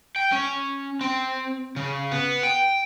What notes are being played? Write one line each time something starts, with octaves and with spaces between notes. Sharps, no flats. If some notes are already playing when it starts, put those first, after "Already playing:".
G5
C#4
C4
C#3
B3
G5